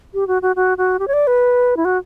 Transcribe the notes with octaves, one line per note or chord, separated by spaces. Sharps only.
G4
F#4
F#4
F#4
F#4
G4
C#5
D5
B4
E4
F#4